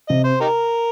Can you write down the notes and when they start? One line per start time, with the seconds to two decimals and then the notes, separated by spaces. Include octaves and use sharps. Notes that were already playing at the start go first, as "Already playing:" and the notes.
0.09 C3 D#5
0.24 C5
0.40 D#4 G4 A#4